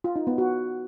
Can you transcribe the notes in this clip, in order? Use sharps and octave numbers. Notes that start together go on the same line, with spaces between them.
F4
D#4
B3
F#4